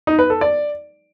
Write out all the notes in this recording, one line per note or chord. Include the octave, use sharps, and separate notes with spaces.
D#4
B4
A4
D5